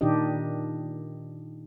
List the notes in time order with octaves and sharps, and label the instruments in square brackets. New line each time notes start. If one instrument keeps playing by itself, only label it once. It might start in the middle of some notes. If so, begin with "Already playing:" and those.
[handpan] A#2 D#3 D4 D#4 G4 D#5